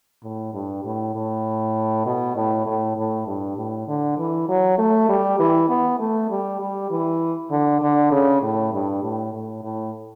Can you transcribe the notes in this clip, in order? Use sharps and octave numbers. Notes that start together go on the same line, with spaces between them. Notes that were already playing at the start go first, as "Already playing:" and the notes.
A2
G2
A2
A2
B2
A2
A2
A2
G2
A2
D3
E3
F#3
A3
G3
E3
B3
A3
G3
G3
E3
D3
D3
C#3
A2
G2
A2
A2
A2